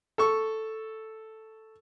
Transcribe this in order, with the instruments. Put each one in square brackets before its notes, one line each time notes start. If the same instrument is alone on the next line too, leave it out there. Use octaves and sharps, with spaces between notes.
[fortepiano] A4 C#6